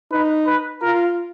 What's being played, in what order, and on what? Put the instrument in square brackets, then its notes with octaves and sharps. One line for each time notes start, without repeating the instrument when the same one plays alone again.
[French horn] D#4 [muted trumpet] B4
[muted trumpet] B4
[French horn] F4 [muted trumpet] A#4